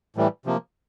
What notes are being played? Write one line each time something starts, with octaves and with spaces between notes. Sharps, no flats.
A2 E3 G3
C3 F3 A#3